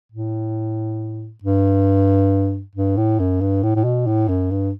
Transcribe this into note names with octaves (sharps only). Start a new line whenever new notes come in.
A2
G2
G2
A2
F#2
G2
A2
A2
B2
A2
F#2
G2